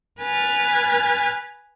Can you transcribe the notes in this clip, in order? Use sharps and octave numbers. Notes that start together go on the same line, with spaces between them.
B4 G#5 F6 A6